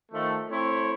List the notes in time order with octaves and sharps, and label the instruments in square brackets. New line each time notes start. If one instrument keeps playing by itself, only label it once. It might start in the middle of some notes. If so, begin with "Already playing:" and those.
[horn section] D#3 F3 A3
A3 C4 E4 C#5